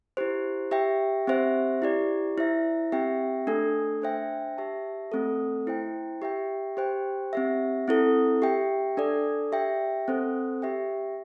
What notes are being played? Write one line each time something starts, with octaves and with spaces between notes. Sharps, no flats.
E4 G4 C5
G4 E5 G5
C4 G4 C5 E5
E4 G4 D5
E4 C5 E5
C4 G4 E5 G5
A3 D4 A4
D4 C5 E5 G5
G4 E5 A5
A3 C4 A4
E4 C5 G5
G4 E5 G5
G4 C5 G5
C4 G4 E5
C4 E4 A4
G4 E5 G5
D4 A4 D5
G4 E5 G5
C4 A4 C5
G4 E5 G5